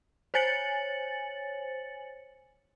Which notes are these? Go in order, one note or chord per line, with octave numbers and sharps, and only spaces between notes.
C5 C#5 G#5 A6 C#7 F#7